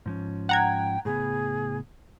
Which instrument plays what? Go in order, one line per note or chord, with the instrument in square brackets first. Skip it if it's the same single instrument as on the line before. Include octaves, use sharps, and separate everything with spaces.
[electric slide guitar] G#2 F3 C#4
[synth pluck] F#5 A#5 G#6 [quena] G5
[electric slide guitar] A2 C#3 B3 [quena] G#4